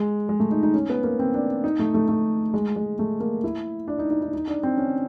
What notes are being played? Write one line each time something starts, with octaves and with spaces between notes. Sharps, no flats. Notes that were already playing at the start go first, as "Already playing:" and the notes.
Already playing: G#3
G#3
A3
D#4
D#4
C#4
B3
A#3
C4
D4
D#4
A3
A3
A3
G#3
G#3
A3
A#3
E4
D4
D#4
D#4
D#4
D#4
D4
C4
C#4